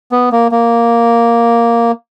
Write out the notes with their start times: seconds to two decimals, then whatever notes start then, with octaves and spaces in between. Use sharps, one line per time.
0.12 B3
0.32 A#3
0.52 A#3